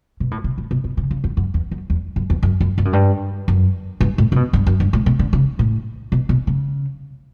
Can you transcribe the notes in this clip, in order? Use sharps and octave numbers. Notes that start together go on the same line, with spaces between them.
B2
A2
B2
A2
B2
B2
C#3
C#3
E2
F#2
E2
F#2
E2
F#2
E2
F#2
F#2
G2
F#2
G2
F#2
G2
A2
C#3
B2
G2
F#2
G2
A2
B2
D3
C#3
A2
B2
B2
C#3